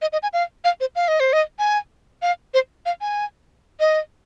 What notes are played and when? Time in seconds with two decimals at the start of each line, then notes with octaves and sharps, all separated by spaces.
0.02 D#5
0.13 D#5
0.23 G#5
0.33 F5
0.64 F5
0.81 C5
0.96 F5
1.08 D#5
1.20 C5
1.33 D#5
1.59 G#5
2.22 F5
2.54 C5
2.86 F5
3.01 G#5
3.80 D#5